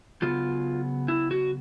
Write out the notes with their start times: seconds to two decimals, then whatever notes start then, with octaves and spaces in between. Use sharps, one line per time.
0.22 C#3 F#3 B3 F4
1.08 E4
1.31 F#4